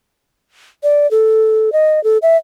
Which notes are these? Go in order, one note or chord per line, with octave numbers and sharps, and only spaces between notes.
D5
A4
D#5
A4
E5